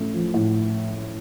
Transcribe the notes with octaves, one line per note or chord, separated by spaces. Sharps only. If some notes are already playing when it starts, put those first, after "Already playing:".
Already playing: A2 A3 C#4
F3
A2